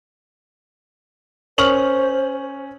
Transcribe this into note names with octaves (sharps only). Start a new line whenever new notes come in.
C#4 A#4 C5 C#6 F6 F#7